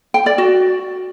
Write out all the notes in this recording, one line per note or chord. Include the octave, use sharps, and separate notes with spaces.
G5
D5
F#4